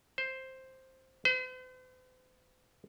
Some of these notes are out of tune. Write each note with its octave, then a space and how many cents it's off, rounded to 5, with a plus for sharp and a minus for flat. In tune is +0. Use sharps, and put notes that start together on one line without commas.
C5 +5
C5 -45